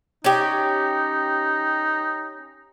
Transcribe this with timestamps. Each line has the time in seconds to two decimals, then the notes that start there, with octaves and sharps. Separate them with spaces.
0.24 C#4 D#4 G4